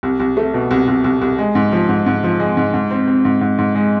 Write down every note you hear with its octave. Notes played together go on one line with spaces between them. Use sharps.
C2
C2
A3
B2
C2
C2
C2
C2
G#3
G#2
F3
G#2
G#2
F3
G#3
G#2
G#2
C4
C4
G#2
G#2
G#2
G#3